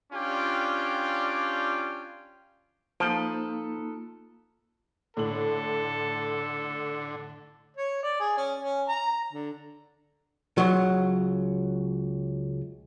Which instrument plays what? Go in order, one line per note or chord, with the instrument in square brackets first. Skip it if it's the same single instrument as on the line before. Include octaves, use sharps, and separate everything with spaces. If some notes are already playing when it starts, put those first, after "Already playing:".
[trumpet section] C#4 D4 F4 G4 D5 G5
[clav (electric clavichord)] F3 [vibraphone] A#3 D#4 [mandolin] F4 A4 B4
[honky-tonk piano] A2 F#7 [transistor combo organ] D3 [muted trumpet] A4
[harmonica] C#5
D5
G#4
C#4
C#4
A#5
D3
[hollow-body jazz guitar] C#2 F#3